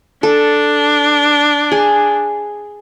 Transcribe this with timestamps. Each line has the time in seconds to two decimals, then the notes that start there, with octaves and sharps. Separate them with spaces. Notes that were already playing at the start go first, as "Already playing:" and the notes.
0.23 D4 A4
1.72 G#4